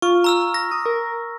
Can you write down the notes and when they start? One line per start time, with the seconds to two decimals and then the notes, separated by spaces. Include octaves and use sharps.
0.02 F4 C#6
0.24 A#5 E6 F6
0.54 A#6
0.71 D#6
0.86 A#4